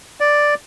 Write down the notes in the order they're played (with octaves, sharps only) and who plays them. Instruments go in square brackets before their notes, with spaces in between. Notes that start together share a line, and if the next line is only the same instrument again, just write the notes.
[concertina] D5